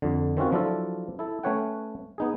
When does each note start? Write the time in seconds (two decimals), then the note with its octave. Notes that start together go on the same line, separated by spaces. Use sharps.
0.02 F2 D3
0.37 D#3 C4 C#4 F4 F#4
0.52 F3 F#3 D4 E4 F4 A4
1.19 E4 A4
1.43 A3 C#4 B4 C#5 F#5 G5
2.18 B3 D#4 G#4